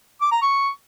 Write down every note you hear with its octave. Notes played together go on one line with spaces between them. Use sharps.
D6
A#5
C#6